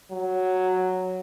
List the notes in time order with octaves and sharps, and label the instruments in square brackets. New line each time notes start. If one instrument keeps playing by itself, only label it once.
[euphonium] F#3